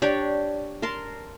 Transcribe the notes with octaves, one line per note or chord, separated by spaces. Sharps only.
D4 G4 C#5 D5
A#4 A5 C6